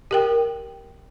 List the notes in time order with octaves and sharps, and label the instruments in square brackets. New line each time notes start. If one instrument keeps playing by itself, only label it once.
[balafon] G4 A#4 G5